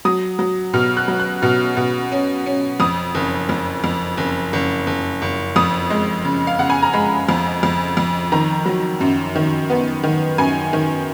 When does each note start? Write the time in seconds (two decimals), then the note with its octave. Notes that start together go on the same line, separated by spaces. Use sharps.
0.05 F#3 D#6
0.39 F#3
0.73 B2 F6
0.97 F#6
1.08 F#3
1.20 F#6
1.42 B2 F6
1.77 B2
2.12 C#4
2.46 C#4
2.80 F2 D#6
3.15 F#1
3.49 F2
3.84 F2
4.18 F#1
4.53 F#1
4.87 F#1
5.22 F#1
5.56 F2 D#6
5.90 G#3
6.25 C#3
6.47 F5
6.59 C#3 F#5
6.70 G#5
6.82 A#5
6.93 G#3 B5
7.29 F2
7.63 F2
7.97 F2
8.32 D#3 A#5
8.65 F#3
9.01 F#2
9.35 D#3
9.70 B3
10.03 D#3
10.38 F#2 G#5
10.73 D#3